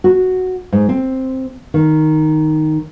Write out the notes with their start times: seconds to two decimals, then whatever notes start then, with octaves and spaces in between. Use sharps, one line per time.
0.04 F#4
0.72 G#2
0.89 C4
1.74 D#3